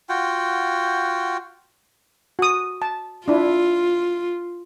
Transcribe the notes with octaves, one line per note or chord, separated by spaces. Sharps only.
F4 F#4 F#5 G5
F#4 D#6
A5
D4 E4 F4